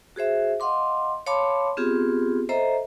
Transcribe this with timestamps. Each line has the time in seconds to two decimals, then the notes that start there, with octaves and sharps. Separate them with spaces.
0.16 F#4 G#4 C5 E5
0.60 D#5 F5 F#5 C6 D6
1.26 C#5 F5 A5 B5 C6 D6
1.77 B3 C4 F4 G4 G#4
2.49 A4 C5 D#5 E5 A#5